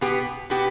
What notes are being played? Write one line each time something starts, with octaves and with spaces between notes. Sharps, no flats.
B2 B3 G4
B2 B3 G4